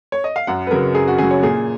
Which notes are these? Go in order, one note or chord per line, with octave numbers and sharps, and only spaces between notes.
C#5
D#5
F5
F#2 F#5
B4
C#3 F#3 A#4
F#2 G#4
F#4
C#3 F#3 G#4
C#5
A#2 G#4